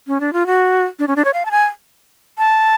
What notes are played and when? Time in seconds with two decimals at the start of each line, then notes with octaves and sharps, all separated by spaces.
0.07 C#4
0.20 D4
0.33 F4
0.47 F#4
0.99 D4
1.08 C#4
1.16 D4
1.25 C#5
1.34 F5
1.46 A5
1.51 G#5
2.38 A5